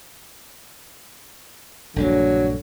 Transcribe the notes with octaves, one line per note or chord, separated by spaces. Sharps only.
A#1 G2 D3 F#3 A#3